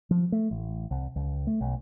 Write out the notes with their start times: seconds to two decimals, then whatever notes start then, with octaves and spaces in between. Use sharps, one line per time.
0.11 F3
0.32 A3
0.51 A1
0.91 C2
1.16 C#2
1.47 A3
1.61 B1